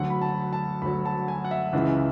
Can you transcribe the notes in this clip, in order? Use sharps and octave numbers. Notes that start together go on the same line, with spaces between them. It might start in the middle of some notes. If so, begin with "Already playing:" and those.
Already playing: D2 D3 F#3 F#5
B5
A5
A5
D2 D3 F#3 B5
A5
G#5
F#5
E5
C#2 C#3 E3